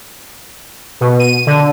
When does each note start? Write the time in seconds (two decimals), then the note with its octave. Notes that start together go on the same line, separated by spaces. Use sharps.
1.01 B2
1.20 D#7
1.46 D3